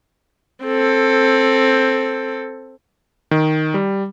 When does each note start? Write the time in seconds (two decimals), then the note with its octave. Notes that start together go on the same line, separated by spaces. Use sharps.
0.65 C4 A4
3.31 D#3
3.74 G3